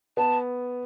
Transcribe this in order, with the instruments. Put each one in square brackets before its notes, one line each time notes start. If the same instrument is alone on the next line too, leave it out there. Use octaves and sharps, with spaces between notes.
[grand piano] B3 [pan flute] A5